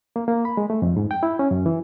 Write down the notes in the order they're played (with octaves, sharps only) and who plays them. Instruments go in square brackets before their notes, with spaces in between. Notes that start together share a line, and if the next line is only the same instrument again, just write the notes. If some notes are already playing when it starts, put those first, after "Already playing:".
[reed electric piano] A#3
A#3
B5
G#3
A3
F2
G#2
G5
E4
C#4
F#2
E3